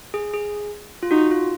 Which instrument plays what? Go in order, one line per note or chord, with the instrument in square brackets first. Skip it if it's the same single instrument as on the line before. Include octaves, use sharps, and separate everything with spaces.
[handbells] G#4
G#4
F4
[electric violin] D#4 [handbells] F#4
[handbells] F4